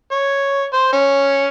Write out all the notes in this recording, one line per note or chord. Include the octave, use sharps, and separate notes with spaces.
C#5
C5
C#4